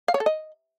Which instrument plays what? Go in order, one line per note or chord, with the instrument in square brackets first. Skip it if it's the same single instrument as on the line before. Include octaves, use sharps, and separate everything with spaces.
[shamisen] F5
C#5
A4
D#5